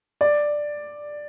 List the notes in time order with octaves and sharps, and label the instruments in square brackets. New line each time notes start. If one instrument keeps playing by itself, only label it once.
[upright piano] D5